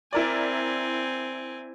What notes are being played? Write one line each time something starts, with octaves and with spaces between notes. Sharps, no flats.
C4 E4 A#4 D5 G#5